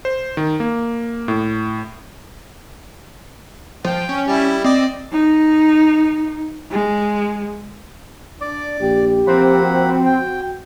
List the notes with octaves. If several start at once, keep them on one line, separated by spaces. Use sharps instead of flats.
C5
D#3
A#3
A2
F3 G5
C#4
G3 E4
C4 D5 D#5
D#4
G#3
D4 D5 D6
A#1 G4
F3 A#3 C4 F#5 B5
F#4
F#4 G5